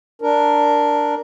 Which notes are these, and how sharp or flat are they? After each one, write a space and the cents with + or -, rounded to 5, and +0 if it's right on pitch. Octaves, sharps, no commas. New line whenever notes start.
D4 +0 A#4 +0